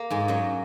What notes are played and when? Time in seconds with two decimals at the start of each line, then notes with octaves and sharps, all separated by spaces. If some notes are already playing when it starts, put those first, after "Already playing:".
Already playing: A#3
0.10 G#2 G#3
0.28 F#2 F#3